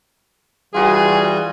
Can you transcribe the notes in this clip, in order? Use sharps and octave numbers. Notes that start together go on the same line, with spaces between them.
E3 G3 F4 F#4 G#4